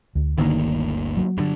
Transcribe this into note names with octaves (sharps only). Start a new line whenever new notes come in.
D2
G1 D2 D3 D#3 A#3
F#3
G2 D3